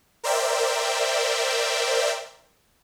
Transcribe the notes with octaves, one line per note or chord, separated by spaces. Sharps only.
A#4 C5 D5 E5 G5